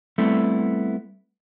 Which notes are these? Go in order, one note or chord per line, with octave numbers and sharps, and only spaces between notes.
G3 A3 B3 C4 E4 A4